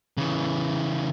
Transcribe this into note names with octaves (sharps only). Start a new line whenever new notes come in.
C#3 E3